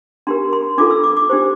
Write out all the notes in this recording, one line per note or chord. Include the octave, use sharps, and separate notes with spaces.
D4 G4 A#4 C6
C6
D4 F4 A4 D6
E6
D6
D6
D4 G4 C5